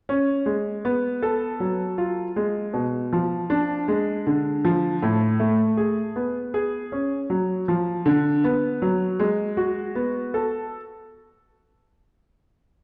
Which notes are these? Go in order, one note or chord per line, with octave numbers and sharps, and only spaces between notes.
C#4
G#3
B3
A4
F#3
F4
G#3
B2
F3
D4
G#3
D3
F3
A2
A3
G#4
B3
G#4
C#4
F#3
F3
D3
B3
F#3
G#3
F#4
B3
A4